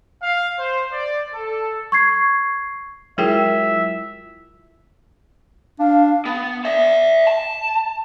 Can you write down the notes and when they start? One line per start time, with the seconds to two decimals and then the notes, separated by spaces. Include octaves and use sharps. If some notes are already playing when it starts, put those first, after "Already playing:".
0.22 F5
0.59 C5
0.93 D5
1.33 A4
1.92 C#6 G#6 C7
3.18 F#3 G#3 E4 F4 G#4 A#4 E5 G5
5.79 D4 F5
6.25 B3
6.65 D5 E5
7.27 A5